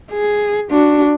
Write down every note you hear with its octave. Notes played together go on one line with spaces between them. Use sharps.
G#4
D4 F#4